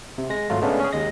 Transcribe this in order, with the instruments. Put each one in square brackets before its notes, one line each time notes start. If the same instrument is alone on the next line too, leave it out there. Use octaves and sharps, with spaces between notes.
[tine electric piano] C3
G#3 A#6
G#1 F#3 A3 F4
C#3 G#3 A3 B3 C#4 D4
C#4 G#4
D#2 G#3 D#5 A#6